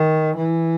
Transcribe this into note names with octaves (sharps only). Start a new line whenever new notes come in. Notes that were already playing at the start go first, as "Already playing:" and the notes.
Already playing: D#3
E3